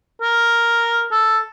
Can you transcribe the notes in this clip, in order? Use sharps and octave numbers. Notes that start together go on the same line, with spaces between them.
A#4
A4